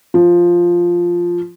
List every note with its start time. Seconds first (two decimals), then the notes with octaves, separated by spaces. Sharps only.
0.14 F3